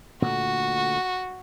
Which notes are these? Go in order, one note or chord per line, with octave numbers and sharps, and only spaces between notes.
A#2 D3 A3 F#4